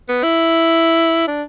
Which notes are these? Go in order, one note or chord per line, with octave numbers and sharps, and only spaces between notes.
B3
E4
D4